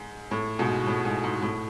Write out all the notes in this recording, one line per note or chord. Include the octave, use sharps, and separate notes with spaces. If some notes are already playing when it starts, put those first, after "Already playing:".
Already playing: G#2
A2
G#2 B2
A2
G#2
G#2
A2